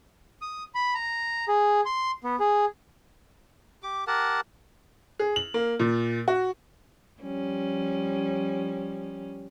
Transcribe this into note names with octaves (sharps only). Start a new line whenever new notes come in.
D#6
B5
A#5
G#4
C6
B3
G#4
G4 D6
G4 A#4 F#5 A5
G#4
F#7
A#3
A#2
F#4
F3 G3 C#4